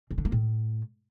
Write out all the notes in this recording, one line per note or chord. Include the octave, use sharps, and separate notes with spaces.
C#3
D3
A#3
A2